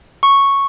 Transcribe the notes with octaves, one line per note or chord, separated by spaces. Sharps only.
C#6